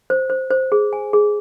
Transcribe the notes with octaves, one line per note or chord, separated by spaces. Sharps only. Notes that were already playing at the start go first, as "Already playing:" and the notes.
C5
C5
C5
G#4
G#5
G#4